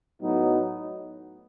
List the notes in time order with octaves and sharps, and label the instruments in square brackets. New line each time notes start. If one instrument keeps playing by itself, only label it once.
[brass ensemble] A2 F#3 B3 D#4